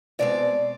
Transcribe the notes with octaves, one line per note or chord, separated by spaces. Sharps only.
B2 G#3 C4 D5